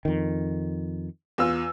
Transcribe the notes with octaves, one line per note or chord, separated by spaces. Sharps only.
F2 D#3
E2 F4 E6